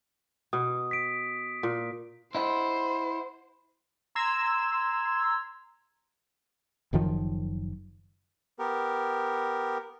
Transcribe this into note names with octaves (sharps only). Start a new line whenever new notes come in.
B2 D#6
B6 D7
A#2
E4 C5 D#5 F#5
A#5 C6 E6 G#6
F#1 F#2 D#3 F3
B3 G4 A#4